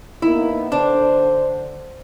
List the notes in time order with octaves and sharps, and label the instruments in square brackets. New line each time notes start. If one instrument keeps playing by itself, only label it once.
[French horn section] A#3 B3 D#4 [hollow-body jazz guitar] E4
[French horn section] D3 C5 [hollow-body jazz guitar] D4